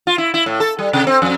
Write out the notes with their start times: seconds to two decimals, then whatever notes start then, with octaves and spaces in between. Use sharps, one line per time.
0.07 F4
0.18 E4
0.34 E4
0.46 A2
0.60 A4
0.79 G3
0.93 C3
1.07 C4
1.22 F2